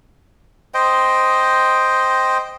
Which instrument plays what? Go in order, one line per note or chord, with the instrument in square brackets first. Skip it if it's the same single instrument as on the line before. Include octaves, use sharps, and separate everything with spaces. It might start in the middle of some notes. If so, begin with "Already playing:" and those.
[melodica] C5 D#5 G5